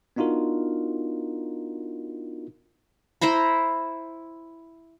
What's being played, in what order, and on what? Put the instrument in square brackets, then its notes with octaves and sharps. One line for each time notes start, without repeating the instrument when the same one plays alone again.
[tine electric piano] B3 D4 D#4 F4 F#4 A#4
[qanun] E4 C5 A#5 B5